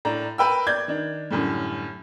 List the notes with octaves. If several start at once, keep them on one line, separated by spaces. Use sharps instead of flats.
A2 D4 A#5
A#4 B4 G5 E6
D5 G6 G#6
D#3 D4
F#2 A2 D3 G3